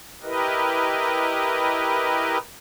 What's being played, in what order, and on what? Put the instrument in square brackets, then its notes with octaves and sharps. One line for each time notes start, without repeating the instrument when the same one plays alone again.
[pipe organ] E4 G4 A#4 B4 D#5